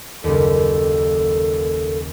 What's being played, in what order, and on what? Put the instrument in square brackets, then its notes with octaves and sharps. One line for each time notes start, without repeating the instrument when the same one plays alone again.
[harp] F#1 D#2 [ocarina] A4